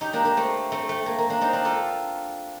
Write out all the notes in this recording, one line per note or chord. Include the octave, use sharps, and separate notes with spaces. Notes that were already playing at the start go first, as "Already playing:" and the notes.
D#4 G4
A#3 D4
A#3
A3 C4
A3 C4
A3
A#3
A#3
A#3 D4
C4 D#4
D4 F4
F4 A4